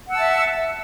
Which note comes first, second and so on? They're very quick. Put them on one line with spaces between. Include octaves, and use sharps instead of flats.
F#5 E6 A5 E5